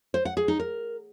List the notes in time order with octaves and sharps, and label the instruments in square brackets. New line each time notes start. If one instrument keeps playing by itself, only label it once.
[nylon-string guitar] C5
F#5
G#4
D#4
A#4